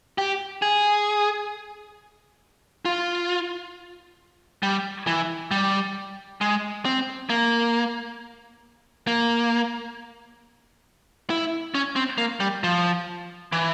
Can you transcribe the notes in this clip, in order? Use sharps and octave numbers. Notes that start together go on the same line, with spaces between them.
G4
G#4
F4
G3
E3
G3
G#3
C4
A#3
A#3
E4
C#4
C4
A#3
G3
F3
E3